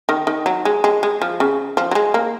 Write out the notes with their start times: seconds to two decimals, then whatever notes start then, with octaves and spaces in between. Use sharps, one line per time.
0.09 D#3
0.27 D#3
0.46 F#3
0.65 G#3
0.84 G#3
1.03 G#3
1.22 F3
1.40 C#3
1.77 F3
1.91 F#3
1.95 G#3
2.14 A#3